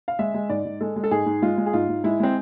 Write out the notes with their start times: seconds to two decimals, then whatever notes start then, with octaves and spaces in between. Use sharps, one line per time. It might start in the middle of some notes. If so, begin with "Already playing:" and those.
0.08 F5
0.19 G#3 E5
0.34 G#3
0.49 G#2 D5
0.65 G#2
0.81 G#3 A4
0.96 G#3
1.04 A4
1.11 G#2 G#4
1.26 G#2
1.42 G#3 F4
1.58 G#3
1.66 G#4
1.73 G#2 F4
1.89 G#2
2.04 G#3 E4
2.20 G#3 C4